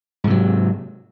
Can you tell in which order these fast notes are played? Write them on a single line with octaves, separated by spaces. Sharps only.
G#2 C3 F#3